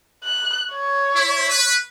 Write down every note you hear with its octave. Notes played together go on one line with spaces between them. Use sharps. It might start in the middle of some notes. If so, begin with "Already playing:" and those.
F#6
C#5
E4
B4